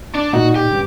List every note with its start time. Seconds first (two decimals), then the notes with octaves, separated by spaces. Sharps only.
0.15 D4
0.33 A#2 D#4 F#4
0.56 G4
0.71 G2 C#3